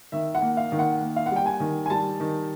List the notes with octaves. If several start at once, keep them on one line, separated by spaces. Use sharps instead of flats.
D#3 E5
F#5
A#3
F5
D#3
F#5
A#3
F5
F#5
G3 G5
G#5
D#3
G#5
G3 A5
D#3